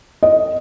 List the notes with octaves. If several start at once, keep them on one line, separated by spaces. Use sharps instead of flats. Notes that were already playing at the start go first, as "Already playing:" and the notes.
D#5